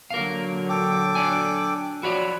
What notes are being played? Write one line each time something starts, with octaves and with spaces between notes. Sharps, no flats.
A#2 D3 F#3 A#4 F5
A4 G5 D6
D4 D5 G#5
F3 F#4 C#5 D5 B5